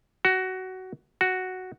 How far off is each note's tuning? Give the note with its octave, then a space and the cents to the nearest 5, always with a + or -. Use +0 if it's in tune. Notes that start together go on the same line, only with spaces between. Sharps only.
F#4 +15
F#4 +0